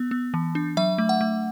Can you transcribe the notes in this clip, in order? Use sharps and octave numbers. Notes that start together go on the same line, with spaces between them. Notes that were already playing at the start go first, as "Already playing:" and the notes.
Already playing: B3
B3
E3
D4
F#3 E5
A3
F#5
A3